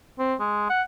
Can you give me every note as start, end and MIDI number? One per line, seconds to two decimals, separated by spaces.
0.19 0.35 60
0.39 0.68 56
0.70 0.82 78